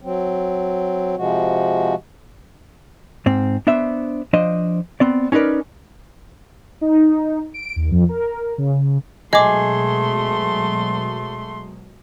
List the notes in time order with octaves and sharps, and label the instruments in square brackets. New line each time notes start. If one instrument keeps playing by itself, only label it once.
[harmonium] F#3 C4
C3 F3 G#3 F#4
[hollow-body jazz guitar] G#2 C4
B3 D4 C5 E5
F3 D4 C5 D#5
B3 C4 D5
C#4 D#4 A#4 B4 D5
[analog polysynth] D#4
D7
D#2
F2
A#4
C#3
[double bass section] B2 F#3 G#3 [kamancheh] A3 C6 [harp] G#4 [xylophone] D#5 D6